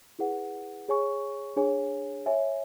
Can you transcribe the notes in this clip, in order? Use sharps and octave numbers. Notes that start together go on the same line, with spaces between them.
E4 G#4 B4 F#5
G#4 C#5 G#5 C#6
D4 G#4 C#5 G#5
C#5 E5 G#5